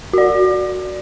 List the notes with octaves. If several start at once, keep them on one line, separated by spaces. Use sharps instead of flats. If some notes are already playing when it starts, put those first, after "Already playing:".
F#4 D5